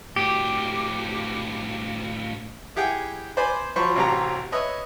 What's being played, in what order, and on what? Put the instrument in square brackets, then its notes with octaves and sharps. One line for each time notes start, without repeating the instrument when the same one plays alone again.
[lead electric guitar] A2 F#4 [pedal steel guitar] G4
[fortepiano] E4 G4 G#4 F#5 G5
B4 C5 D5 G#5 B5 C6
F3 F#3 C5 B5 C#6
A1 C3 F#3 C4 G4 A#5
B4 C#5 D#5 E5